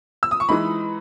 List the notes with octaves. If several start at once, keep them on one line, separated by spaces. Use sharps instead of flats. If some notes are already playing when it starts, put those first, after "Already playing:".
E6
D#6
C#6
E3 G#3 D#4 B5